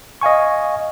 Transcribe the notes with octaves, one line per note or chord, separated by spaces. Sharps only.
D#5 F5 G#5 C#6